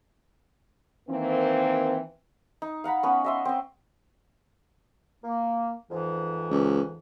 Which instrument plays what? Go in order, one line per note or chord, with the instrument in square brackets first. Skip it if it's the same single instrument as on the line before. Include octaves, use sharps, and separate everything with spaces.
[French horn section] D#3 E3 A#3 C4
[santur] D#4
F5 F#5 A#5 B5
B3 C#4
D#5 E5 C6
C4 D#5
[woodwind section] A#3
F2 G#2 E3
[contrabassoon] C#2